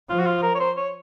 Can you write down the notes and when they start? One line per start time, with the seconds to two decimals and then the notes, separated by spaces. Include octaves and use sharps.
0.10 F3 F4
0.19 F#4
0.26 F4
0.43 A#4
0.55 C#5
0.60 C5
0.77 C#5